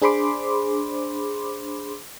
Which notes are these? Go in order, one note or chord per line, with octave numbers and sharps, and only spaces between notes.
D4 G#4 C5 B5 C6 D6